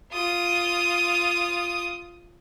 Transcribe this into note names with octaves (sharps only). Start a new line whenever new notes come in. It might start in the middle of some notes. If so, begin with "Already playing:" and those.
F4 D#6